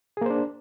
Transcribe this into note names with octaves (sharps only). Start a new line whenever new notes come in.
A#3 D4 G#4 C5